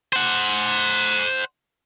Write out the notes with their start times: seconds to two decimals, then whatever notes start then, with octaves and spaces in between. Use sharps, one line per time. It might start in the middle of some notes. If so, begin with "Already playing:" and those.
0.13 C5 F#5